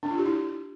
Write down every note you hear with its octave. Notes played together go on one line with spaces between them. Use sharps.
D4
F4
G4
E4